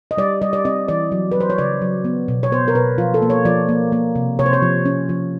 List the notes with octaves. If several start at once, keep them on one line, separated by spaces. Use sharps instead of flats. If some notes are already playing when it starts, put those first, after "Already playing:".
D#5
G3 D5
G3 D#5
D5
C4 D#5
E3 D5
F#3
F#3 B4
C5
C#5
C#3 D5
F#3
B3
B2
C#5
B3 C5
A#4
B2 B4
F3 F4
A4
A#3
C#5
F3 D5
A#3
A#3
C3
C3 C#5
C5
C#5
F3
C#4
F3